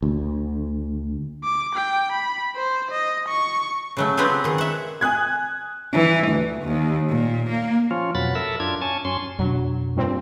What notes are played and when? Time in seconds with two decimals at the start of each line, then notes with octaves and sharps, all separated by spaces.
0.02 D2
1.44 D6
1.74 G5
2.12 B5
2.56 C5
2.91 D#5
3.28 C#6
3.97 C#3 F#3 A3
4.17 F#3 B3 C4 F4 G4 G#4
4.44 D#3 G#4
4.58 E5 F#5
5.01 G#5 D#6 F#6 G#6
5.93 E3
6.28 D2
6.64 D#2
7.10 A#2
7.50 A#3
7.91 F3 C#4 F4
8.15 F2 B2 F#3 B5 A6
8.35 A4 A#4 E5
8.60 F#2 D4 F4 G#6
8.82 C#4 G#5 A5
9.05 F#2 C#4 C6
9.39 F2 B2 F#3 D4
9.96 G2 A#2 C4